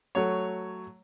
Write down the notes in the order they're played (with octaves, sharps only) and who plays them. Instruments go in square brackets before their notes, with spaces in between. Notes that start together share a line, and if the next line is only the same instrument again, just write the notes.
[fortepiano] F#3 A3 C#5